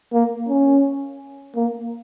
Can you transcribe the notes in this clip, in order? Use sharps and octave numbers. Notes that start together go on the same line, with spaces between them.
A#3
C#4
A#3